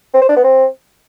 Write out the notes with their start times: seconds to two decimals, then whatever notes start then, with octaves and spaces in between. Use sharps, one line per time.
0.14 C4
0.21 C5
0.29 D4
0.36 B3
0.44 C4